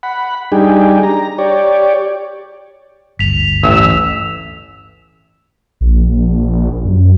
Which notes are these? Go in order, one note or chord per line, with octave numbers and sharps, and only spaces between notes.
F#5 B5
G3 D4 D#4 G4 G#4
A#5
G4 C#5 D5
G1 D2 B6 F7
A1 E6
A#1
F#2